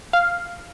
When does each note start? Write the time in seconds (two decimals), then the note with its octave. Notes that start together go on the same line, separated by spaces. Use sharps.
0.13 F5